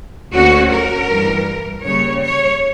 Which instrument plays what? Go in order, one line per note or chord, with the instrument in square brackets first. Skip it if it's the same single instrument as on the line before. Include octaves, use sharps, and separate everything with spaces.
[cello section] D2 D3 A#3 C#4 F#4
A#4
G2 E3 G3
C#3 G3 A#3 C#5
C#5